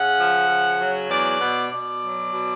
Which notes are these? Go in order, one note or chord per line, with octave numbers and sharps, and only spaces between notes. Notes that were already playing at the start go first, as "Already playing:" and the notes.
Already playing: C#3 F#5
F3
C#3
F#3
E2 D5
B2
B2 D5
F#3
B2